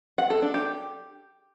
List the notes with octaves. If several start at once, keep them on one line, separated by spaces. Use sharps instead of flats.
F#5
A4
D4
G4